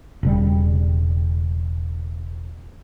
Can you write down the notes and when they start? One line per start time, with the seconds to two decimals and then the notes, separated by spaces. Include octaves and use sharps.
0.23 E1 C#3 G3